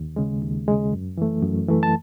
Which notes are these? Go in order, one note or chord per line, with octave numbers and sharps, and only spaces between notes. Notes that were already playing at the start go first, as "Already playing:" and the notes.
Already playing: D#2
C#3 G#3
D#2
C#3 G#3
F#2
E3 A3
F#2
E3 A3
A5